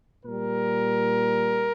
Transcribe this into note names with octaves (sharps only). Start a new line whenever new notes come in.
A#2 G3 A#4